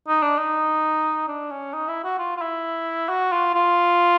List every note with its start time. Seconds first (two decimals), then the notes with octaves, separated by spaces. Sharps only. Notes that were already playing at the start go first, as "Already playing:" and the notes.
0.08 D#4
0.22 D4
0.38 D#4
1.28 D4
1.51 C#4
1.73 D#4
1.88 E4
2.04 F#4
2.19 F4
2.37 F4
2.41 E4
3.09 F#4
3.33 F4
3.55 F4